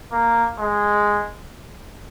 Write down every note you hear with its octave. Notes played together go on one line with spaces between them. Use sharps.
A#3
G#3